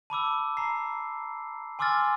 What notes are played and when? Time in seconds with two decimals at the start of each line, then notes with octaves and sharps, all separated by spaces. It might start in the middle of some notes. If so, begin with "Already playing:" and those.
0.10 A5 B5 D6 E6
0.57 A#5 C7
1.79 G#5 C6 D6 E6 F6 A6